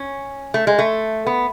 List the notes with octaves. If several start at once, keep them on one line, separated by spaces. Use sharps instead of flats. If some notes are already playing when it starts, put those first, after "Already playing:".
Already playing: C#4
A3
G#3
A3
B3